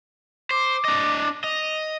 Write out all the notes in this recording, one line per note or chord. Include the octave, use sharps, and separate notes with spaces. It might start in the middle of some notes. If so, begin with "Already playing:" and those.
C5 D6
D4 D#5
D#5 F7